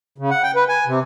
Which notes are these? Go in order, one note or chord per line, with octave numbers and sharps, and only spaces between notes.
C#3
F#5
G5
B4
G#5
C3